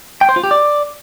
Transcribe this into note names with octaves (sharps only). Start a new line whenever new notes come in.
G5
C5
F4
G4
D5